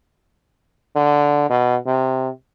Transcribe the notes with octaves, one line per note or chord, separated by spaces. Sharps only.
D3
B2
C3